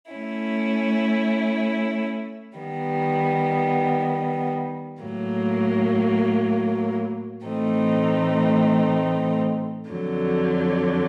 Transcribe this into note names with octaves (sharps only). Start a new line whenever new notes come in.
A3 C#4 E4
D#3 G3 B3
A2 F#3 A#3
A2 E3 A3 C4 D#4
F2 D3 F#3